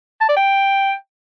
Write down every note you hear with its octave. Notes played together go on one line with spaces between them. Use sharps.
A5
D5
G5